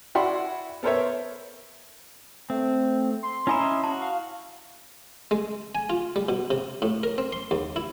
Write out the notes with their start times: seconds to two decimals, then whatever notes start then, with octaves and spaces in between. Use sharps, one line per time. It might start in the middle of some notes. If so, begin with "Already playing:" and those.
0.15 E4 F#4 D5 F#5 B5 C6
0.83 B3 A4 A#4 C5 C#5 E5
2.50 A3 C4
3.23 C6
3.47 C#4 E4 D#5 E5 G#5 B5
3.83 F#4 A5
4.01 F5
5.31 G#3
5.75 G#5
5.90 F4
6.16 G3
6.29 B2
6.50 C3
6.82 A2
7.03 A#4
7.18 C4
7.32 C6
7.51 D#2
7.76 E4